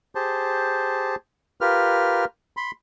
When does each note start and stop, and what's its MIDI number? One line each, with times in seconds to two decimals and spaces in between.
0.15 1.15 67
0.15 1.15 68
0.15 1.15 72
0.15 1.15 81
1.61 2.25 65
1.61 2.25 67
1.61 2.25 70
1.61 2.25 71
1.61 2.25 89
2.57 2.71 83
2.57 2.71 84